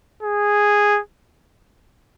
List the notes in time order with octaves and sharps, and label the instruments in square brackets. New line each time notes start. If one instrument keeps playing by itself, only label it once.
[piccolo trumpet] G#4